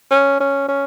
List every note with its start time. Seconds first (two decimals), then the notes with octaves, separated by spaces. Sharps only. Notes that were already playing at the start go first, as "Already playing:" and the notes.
0.11 C#4
0.40 C#4
0.68 C#4